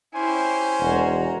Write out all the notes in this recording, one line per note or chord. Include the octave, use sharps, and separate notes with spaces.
C#4 E4 G4 C5 G#5
E1 F#4 A#5